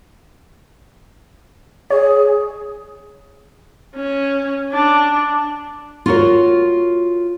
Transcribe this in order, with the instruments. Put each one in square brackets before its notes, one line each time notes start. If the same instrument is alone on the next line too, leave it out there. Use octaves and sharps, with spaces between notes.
[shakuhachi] G#4 [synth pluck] C#5
[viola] C#4
D4
[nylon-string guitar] F4 F#4 A#4 C#5